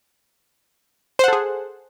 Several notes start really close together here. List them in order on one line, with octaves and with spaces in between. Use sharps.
C5 F#5 A4 G#4